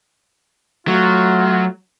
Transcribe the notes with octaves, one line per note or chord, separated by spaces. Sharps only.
F#3 A3 F4